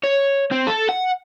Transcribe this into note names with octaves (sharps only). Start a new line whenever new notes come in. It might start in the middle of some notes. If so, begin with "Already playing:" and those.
C#5
C4
A4
F#5